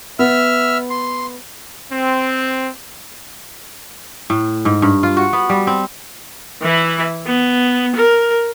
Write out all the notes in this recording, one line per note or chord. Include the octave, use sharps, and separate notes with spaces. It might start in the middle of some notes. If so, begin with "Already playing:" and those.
B3 E5 E6 F6
C6
C4
A2
G#2
G2
F4
F#4
B3
G3
C4
E3 E4
B3
A#4